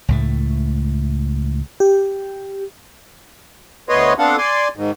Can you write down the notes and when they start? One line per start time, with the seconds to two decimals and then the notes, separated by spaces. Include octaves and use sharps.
0.08 C#2 A2 A3
1.80 G4
3.89 D2 B3 B4 C#5 D#5 C6
4.19 B3 C4 D4 A4 F5 F#5
4.38 D5 G#5 C6
4.76 G#2 D#3